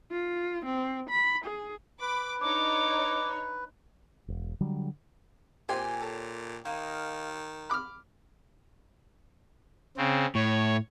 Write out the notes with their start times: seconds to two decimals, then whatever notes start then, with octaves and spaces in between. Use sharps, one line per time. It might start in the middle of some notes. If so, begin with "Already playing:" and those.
0.12 F4
0.65 C4
1.10 B5
1.44 G#4
2.01 B4 B5 D6
2.41 D4 D#4 C#5 D6
4.28 E1
4.60 D3 F#3 G3
5.69 A#2 G4 C5 G5 G#5
6.01 A4 C#5
6.65 D#3 A#3 D#4
7.70 B5 D6 F6 F#6
9.97 C#3 C4
10.35 A2 C#5